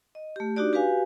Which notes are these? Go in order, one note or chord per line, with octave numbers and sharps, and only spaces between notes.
D#5
A3 G4
D4 D#4 F#4 G4 D5
F#4 G4 B4 F5 G#5